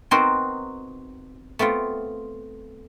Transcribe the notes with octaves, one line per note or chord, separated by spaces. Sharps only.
B3 C4 D#4 F#4 A#4 C5
A3 B3 C4 F4